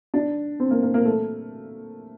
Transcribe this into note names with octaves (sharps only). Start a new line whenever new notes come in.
D4
C4
A#3
A#3
A#3
A3